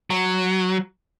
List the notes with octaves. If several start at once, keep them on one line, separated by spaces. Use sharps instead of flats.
F#3